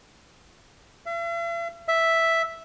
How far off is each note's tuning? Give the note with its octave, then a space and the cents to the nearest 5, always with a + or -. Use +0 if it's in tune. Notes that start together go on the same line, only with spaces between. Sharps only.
E5 +45
E5 +0